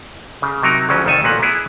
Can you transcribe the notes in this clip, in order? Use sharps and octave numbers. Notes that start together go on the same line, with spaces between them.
C#3
C3 F#3 D#4 A#4
D2 C#3 F3 F#3 C#4
C2 F2 D#3 A3 A4 G#5
A1 A#2 F#3 A#3 B3 F#5
B3 E4 G#4